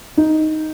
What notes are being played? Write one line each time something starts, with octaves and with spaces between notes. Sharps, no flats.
D#4